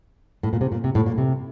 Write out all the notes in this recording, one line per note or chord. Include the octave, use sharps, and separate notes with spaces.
A2
A#2
C3
A#2
C3
A2
A#2
C3